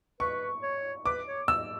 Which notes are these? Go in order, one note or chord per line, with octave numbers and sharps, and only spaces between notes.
B4 C#6
C#5
B4 D6
C#5
E6